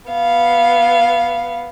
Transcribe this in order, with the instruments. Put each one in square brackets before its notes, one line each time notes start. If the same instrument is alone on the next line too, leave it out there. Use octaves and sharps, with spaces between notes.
[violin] B3 F5